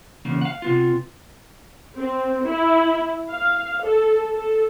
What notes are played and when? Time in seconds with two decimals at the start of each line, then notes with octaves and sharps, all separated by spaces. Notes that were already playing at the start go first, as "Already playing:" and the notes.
0.25 E2 C#3 A#3
0.41 F5 F#5
0.62 C3 B3 F4
1.99 C4
2.47 E4
3.32 F5
3.84 A4
4.35 A4